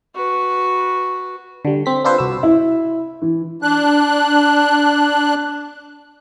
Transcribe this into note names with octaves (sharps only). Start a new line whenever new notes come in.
F#4 B4
D3 G3
C4 B6
C4 D4 F4 A4 B4 C5
C2 F#4 E6
E4
E3
D4 F#6